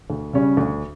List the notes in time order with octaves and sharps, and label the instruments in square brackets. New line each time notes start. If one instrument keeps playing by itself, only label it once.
[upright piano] D2
C#3 G3 C#4
D2